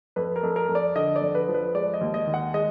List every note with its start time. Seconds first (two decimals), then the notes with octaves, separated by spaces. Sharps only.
0.16 F2 B4
0.36 A#4
0.43 F2
0.56 A#4
0.69 F2
0.75 D5
0.96 D3 D#5
1.16 D5
1.21 F2
1.35 B4
1.49 F3
1.54 B4
1.75 G#3 D5
1.94 D#5
2.01 D#2
2.14 D#5
2.27 D#3
2.34 F#5
2.54 G#3 D#5